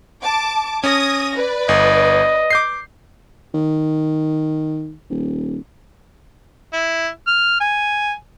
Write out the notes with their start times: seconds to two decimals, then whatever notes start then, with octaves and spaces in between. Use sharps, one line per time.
0.23 A5 D6
0.84 C#4 D#6 G#6 A#6
1.35 B4 D5
1.69 G1 D#5
2.51 D6 G6 C7
3.54 D#3
5.10 D#1
6.73 E4
7.27 F6
7.60 G#5